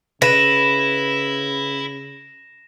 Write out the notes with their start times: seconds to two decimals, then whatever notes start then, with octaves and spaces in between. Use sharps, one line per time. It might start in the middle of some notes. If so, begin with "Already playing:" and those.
0.22 C#3 E4 B4 A#6 E7